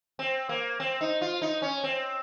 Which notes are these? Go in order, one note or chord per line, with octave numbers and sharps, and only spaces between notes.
C4
A#3
C4
D#4
F4
D#4
C#4
C4